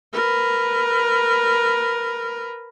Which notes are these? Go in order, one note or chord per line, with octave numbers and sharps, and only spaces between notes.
A#4 B4